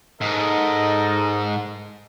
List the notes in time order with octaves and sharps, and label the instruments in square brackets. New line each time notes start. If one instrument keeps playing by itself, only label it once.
[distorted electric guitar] G#2 [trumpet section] A4 A#4 D#5